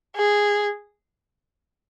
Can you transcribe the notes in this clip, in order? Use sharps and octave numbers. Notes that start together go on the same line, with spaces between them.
G#4